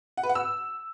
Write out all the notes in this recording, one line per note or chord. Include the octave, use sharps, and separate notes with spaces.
F#5
B4
F#5
E6